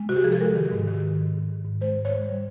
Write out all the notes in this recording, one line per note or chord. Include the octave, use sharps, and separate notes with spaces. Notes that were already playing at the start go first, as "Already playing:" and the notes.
Already playing: G#3
C3 F#4
G4
F3 G#4
A4
G#3 A#4
D#3
G#2
D#3
D#3
G#2
G#2
D#3
G#2
G#3 C5
G#2
C#5
G#3
G3